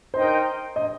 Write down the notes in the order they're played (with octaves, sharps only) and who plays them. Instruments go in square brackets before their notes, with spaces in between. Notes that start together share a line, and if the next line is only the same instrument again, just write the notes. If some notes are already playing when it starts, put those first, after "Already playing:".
[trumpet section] D#4 A#4 D#5 G5 [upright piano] C5
[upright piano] D#5